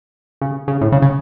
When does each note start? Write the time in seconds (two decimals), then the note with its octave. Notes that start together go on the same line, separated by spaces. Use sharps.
0.41 C#3
0.68 C#3
0.81 A2
0.92 C#3
1.02 C#3